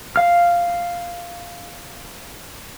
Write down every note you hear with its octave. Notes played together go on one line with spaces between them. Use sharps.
F5 F6